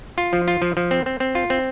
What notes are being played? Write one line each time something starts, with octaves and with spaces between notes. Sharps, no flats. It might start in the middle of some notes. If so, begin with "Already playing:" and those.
F4
F3
F4
F3
F3
C4
C4
C4
F4
C4